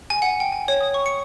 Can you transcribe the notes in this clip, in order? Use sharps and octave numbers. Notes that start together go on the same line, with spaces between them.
G#5
F#5
G5
G#5
C#5
D#6
C#6
C#7